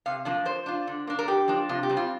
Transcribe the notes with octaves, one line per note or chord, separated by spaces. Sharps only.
C3 F5
F3 A#3 D4
F3 C5
D4 F4
D3
A#3 D4
A#4
D3 G4
F3 A#3 D4
C3 F4
G4
G3 C4
F4